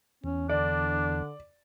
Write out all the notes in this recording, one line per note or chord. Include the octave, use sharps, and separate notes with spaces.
E2 C#4
D3 D4 D5